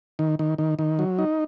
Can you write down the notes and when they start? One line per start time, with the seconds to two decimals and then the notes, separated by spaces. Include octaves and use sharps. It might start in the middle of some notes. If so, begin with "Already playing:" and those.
0.19 D#3
0.39 D#3
0.58 D#3
0.79 D#3
0.99 F#3
1.19 D#4